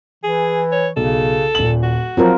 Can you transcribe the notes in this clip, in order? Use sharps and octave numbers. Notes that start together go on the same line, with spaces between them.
E3 G#4
C#5
B1 C#3 A4
D#1 A#2 F#7
F#4
F3 F#3 C4 F4 A#4